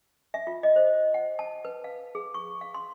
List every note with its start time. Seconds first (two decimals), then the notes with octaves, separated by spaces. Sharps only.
0.34 E5
0.47 F4
0.63 D#5
0.76 C5
1.14 F#5
1.39 A5
1.65 B4
1.84 F5
2.15 G#4
2.34 C#6
2.61 F5
2.74 C6